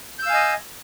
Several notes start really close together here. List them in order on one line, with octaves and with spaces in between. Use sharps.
G6 E6 F5 G#5 D#5